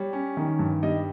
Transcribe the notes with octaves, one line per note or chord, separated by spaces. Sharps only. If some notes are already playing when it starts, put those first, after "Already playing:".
Already playing: G3 C#5
C#4
D#3
G2
G3 D#5